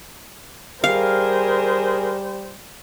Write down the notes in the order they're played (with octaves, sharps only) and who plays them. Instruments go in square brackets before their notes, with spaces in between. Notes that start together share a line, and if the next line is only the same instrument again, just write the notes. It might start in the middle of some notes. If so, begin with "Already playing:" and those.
[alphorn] G3 [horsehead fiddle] G#4 A#4 [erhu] C5 [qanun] F5